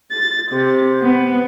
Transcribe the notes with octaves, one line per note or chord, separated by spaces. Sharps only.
A6
C3
B3